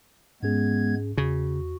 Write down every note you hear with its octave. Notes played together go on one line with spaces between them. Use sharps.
G#2 G#3 B3 C#4 G#4 G#6
E2 C#3 F#4